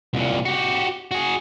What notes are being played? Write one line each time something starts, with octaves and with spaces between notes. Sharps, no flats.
C2 A#2
F#4 G4
F#4 G#4